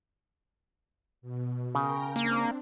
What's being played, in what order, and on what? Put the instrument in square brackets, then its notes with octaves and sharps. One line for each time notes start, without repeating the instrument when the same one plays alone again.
[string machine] B2
[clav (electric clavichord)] C#3 [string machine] A#4 G5 A#5
[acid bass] A#3 [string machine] C4 D4